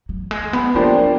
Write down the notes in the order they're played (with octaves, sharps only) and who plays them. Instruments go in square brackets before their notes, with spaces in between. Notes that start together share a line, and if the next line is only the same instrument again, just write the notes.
[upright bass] F#3
G#3
B3
[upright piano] F3 A#3 D4 G4 C5 [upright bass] B3